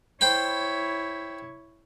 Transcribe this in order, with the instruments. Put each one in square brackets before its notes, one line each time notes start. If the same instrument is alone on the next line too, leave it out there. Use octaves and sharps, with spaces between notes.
[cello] E4 C#5 [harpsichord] C5 G5 B5